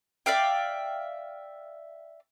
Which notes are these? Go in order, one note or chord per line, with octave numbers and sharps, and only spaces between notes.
D5 E5 F5 G5